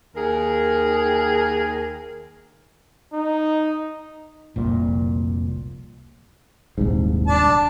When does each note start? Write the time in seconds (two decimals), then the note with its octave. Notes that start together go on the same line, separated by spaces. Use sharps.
0.15 D#2 G#4 A#4
3.14 D#4
4.56 F1 C2 A#2
6.78 D#1 C2 G#2
7.27 D4 A5